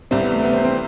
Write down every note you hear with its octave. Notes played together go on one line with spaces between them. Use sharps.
C2 C3 G3 C4
B3
A3
B3
C4
C4